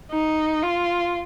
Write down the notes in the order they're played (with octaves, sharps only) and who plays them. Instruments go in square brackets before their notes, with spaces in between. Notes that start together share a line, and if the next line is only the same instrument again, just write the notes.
[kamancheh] D#4
F4